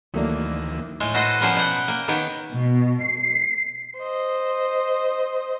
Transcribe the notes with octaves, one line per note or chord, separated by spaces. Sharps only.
D2 D#3 E3 F#3 A3 A#3 D4
A2 G#3
F#4 A4 B4 C5 D#5
F3 G3 A#3 B3 C#4 C5
B2 B4 C#5 F#5 G5
A#3 G5
D#3 B3 B4 C#5 G5
B2
C7
C5 D#5